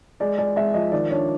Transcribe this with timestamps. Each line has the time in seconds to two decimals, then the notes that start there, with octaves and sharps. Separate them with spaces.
0.20 G#3 D5
0.38 G#3 D5
0.56 G#3 E5
0.74 F3 D#5
0.92 D#3 D5
1.10 D4 C#5